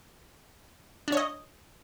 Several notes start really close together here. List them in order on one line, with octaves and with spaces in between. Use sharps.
D4 C#5 D#5